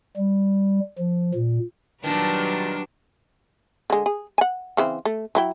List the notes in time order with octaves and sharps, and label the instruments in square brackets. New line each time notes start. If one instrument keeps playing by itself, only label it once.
[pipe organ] G3
F3
A#2
[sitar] A#2 D#3 [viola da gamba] F#3 G3 B4 [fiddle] D4 [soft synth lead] A5
[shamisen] D3 G#3
G#4
F#5 G#5
C#3 E3 C4
A3
F#3 E4 G5